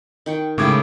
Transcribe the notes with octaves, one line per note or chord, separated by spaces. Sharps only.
D#3 G5 C#6
A2 C#3 G#3 E4 D6 G#6